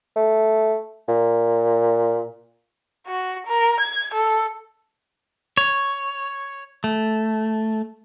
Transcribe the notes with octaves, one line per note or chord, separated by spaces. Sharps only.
A3
A#2
F#4
A#4
G#6
A4
C#5
A3